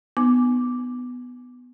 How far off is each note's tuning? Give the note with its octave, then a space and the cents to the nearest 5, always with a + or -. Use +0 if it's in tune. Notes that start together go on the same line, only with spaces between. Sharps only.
B3 +5 D#4 -30 D6 +0